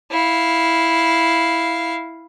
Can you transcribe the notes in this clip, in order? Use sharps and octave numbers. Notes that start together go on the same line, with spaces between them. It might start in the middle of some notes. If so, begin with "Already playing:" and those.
E4 F5